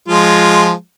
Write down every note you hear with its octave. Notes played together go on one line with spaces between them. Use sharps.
F3 G#3 F4